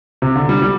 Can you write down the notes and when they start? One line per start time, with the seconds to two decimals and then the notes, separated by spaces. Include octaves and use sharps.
0.22 C3
0.36 D3
0.49 G3
0.62 G3